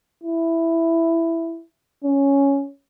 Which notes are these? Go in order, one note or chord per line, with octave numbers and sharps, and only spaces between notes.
E4
C#4